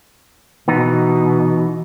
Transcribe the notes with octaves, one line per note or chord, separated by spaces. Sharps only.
B2 E3 B3 D#4